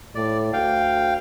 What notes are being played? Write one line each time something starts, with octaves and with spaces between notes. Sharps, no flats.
A2 D5
D2 F5 G5